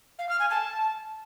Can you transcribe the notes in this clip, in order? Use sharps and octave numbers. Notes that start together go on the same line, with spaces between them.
F5
F6
G#5
A5